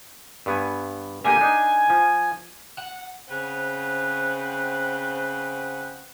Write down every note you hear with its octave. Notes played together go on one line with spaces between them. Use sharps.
G2 B3 G#5
D3 A#3 G4 G#5
D4 D#4
F3
F#5
C#3 C4 B4 C5 F#5